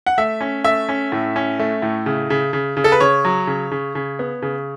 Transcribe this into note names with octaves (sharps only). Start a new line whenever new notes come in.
F#5
A3 E5
C#4
A3 E5
C#4
A2
C#4
A3
A2
C#3
C#3
C#3
C#3
A4
B4
C#3 C#5
F#3
C#3
C#3
C#3
B3
C#3